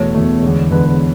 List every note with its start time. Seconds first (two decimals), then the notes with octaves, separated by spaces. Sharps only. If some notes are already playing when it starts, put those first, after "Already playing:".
Already playing: E2 B2 A3 C#5
0.15 E2 B2 A3
0.42 E2 D3 G#3
0.71 E2 D3 G#3 B4
0.86 B4